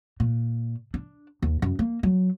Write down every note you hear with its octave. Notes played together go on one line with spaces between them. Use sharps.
A#2
D4
D#2
F#2
A#3
F#3